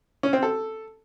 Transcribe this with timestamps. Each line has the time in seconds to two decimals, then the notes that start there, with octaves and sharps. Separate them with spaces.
0.23 C#4
0.33 C4
0.43 A4